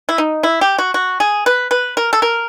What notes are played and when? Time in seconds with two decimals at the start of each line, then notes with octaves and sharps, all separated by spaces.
0.09 E4
0.18 D#4
0.43 E4
0.61 G4
0.78 F#4
0.94 F#4
1.20 G#4
1.46 B4
1.71 B4
1.97 A#4
2.13 A4
2.22 A#4